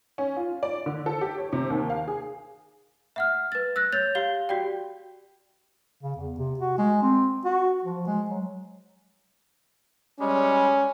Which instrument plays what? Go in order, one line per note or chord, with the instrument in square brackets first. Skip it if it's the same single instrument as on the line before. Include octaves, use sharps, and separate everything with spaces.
[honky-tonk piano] C#4
F4
D5
D3
A4
G4
C#5
C3
D#2
F5
G#4
[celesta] E5 F#5 F6
B4 A6
E6 F#6 A#6
C#5 G6 A6 F7
G4 F5 G7
F#4 G4 D5 G5
[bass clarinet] C#3
E2
C3
F#4
G#3
C4
F#4
F3
G#3
F#3
[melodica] G3 G#3 [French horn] C#4